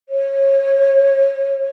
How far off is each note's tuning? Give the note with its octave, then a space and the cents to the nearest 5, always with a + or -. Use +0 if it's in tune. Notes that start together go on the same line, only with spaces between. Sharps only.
C#5 -25